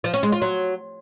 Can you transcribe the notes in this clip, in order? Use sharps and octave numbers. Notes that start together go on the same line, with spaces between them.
F3
C#4
G#3
F4
F#3